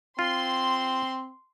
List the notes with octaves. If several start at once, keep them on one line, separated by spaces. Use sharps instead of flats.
C4 F4 C6